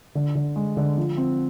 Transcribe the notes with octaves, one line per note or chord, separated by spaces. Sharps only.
D3
D3
G#3
D3
F3
C4